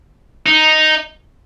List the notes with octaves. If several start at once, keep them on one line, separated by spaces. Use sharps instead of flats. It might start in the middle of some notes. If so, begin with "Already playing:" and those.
D#4